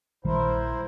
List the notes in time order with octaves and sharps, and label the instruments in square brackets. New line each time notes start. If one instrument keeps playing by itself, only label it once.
[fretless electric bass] A#1 D#3 G3 [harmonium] E4 A#4 C5